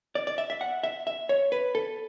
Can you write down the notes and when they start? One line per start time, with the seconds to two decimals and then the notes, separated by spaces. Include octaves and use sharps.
0.15 D5
0.27 D5
0.38 E5
0.50 E5
0.61 F#5
0.83 E5
1.07 E5
1.29 C#5
1.52 B4
1.75 A4